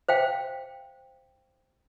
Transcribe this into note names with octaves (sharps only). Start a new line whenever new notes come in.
C5 F5 G5